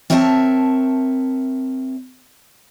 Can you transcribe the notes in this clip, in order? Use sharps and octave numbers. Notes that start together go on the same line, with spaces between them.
C4 A#4 C#5 E5 F5 A5